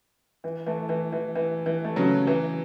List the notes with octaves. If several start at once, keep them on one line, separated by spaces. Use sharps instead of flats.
E3
E3 A3
E3
E3
E3
E3
A3
C#3 F#3
E3